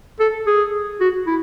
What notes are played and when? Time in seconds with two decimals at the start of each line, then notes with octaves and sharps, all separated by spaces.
0.20 A4
0.47 G#4
1.00 F#4
1.27 E4